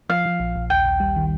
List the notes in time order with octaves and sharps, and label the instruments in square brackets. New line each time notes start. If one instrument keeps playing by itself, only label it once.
[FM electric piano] F3 [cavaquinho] F5
[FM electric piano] F3
A#1
A#1
[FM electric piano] D#2 [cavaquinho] G5
[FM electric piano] D#2
G3
D#3